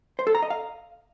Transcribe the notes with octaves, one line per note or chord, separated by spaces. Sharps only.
C5
A4
A#5
D#5
F5